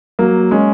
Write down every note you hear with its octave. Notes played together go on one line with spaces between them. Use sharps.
F#3 A#3
G#3 C#4